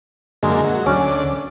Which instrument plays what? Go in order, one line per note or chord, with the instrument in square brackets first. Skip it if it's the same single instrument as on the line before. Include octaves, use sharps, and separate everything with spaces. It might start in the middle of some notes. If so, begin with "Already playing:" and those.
[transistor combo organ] F#2 D3 A#3 [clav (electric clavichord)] G#3
[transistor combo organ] F#3
[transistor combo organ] D2 D5 [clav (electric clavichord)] C#4